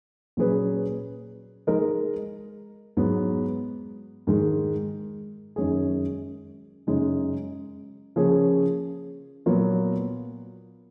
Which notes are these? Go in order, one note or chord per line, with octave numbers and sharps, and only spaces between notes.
A#2 F#3 C#4 G#4 B4
G#3 D#4 A#4 D#5
G#2 F#3 B3
G#2 D#3 G#3
F#2 D#3 G#3 C#4 G#4
F#2 C#3 G#3 D#4
C#3 F3 A#3 C#4 G#4
A#2 F#3 B3 F4 A#4